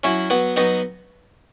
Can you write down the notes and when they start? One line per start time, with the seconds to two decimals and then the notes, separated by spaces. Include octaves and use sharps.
0.04 F#3 C#4 E4
0.30 F#3 B3
0.56 F#3 B3 D#4